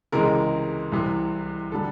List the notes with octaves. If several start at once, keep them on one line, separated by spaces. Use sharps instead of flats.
C#2 C3 E3 G#3 A#4
C2 C3 E3
D3 G3 A4